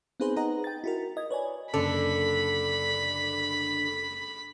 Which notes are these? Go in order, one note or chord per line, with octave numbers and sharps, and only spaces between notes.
B3 C4 D#4 G#4 B4 C5
D#4 G#4 B4 D#5 F#5 A#5
G5 A6
E4 F#4 A#4
D#5 G#6
B4 C#5 D5 G#5
F#1 D3 A4 B5